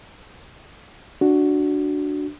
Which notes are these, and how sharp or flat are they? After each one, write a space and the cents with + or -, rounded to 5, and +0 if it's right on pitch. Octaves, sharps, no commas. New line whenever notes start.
D4 +0 F#4 +0